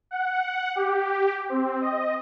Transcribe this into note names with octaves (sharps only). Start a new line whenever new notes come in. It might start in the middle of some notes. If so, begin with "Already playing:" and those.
F#5
G4
C4
D#5